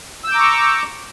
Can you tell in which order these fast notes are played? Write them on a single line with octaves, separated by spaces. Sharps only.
E6 G6 D6 A#5 C#6